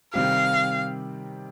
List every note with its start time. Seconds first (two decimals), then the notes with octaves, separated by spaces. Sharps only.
0.14 C3 D#3 G3 C4 G4 F5